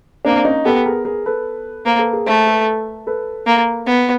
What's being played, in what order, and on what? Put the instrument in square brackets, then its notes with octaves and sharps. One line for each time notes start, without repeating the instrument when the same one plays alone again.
[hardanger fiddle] A#3 [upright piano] C4 D4
[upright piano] C#4 D#4
[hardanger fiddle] B3 [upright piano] G4 A4
[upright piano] G#4 A#4
G#4 A#4
A4 B4
[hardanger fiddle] A#3 [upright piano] A#4 C5
[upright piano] A4 B4
G#4 A#4
[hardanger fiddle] A3 [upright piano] A#4 C5
[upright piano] A4 B4
A4 B4
[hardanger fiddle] A#3
B3